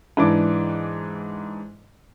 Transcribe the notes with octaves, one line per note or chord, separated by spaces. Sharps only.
G#2 E3 D4 D6